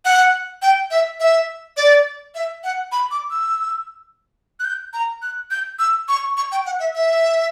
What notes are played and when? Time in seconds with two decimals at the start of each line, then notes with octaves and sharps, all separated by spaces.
0.05 F#5
0.62 G5
0.91 E5
1.20 E5
1.77 D5
2.35 E5
2.64 F#5
2.92 B5
3.11 D6
3.31 E6
4.60 F#6
4.64 G6
4.93 A#5
5.22 F#6
5.51 G6
5.79 E6
6.08 C#6
6.37 C#6
6.52 G5
6.66 F#5
6.80 E5
6.95 E5